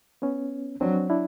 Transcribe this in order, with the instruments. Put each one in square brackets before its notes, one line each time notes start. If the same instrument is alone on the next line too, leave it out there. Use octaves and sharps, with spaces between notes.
[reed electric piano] B3 C#4
[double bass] F#3 [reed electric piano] C4 D4
[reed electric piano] D4 E4